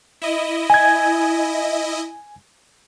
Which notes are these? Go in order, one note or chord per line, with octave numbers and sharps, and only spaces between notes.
E4 D#5
G#5 G#6